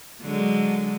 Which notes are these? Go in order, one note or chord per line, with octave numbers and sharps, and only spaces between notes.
D3 F#3 G#3